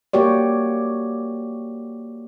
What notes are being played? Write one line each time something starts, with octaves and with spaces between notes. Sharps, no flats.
A#3 F#4 G4 C#5 D5